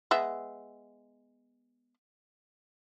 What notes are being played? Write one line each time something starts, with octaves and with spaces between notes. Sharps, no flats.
G#3 B3 E5